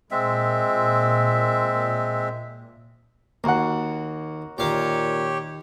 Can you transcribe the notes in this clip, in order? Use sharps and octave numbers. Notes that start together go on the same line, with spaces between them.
A#2 G#3 C4 E5
D#2 A#3 F#4 F#5
D#2 A#2 G4 C#5 F5 A#5